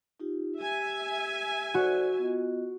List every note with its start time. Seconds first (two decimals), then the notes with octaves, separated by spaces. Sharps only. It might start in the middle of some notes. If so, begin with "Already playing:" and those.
0.20 D#4 F4 G4
0.58 G4 E5 G#5
1.74 F#4 A4 C5 D5
2.19 B3 F4 D#5